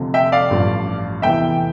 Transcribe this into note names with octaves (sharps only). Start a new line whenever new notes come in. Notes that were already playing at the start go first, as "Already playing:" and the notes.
Already playing: F1 F2 D3 F3
E5 G5
D5 F5
A1 G2 F3
F1 E2 E3 E5 G5